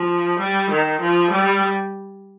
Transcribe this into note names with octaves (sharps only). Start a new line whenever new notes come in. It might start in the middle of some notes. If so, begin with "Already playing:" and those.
Already playing: F3
G3
D#3
F3
G3